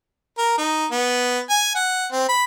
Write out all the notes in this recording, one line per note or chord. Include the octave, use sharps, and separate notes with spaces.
A#4
D#4
B3
G#5
F#5
C4
B5